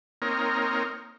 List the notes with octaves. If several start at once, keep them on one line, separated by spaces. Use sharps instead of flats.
A#3 C4 D#4 A#4 C#5